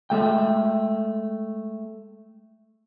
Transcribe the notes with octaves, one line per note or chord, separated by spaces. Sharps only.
G#3 A3 G5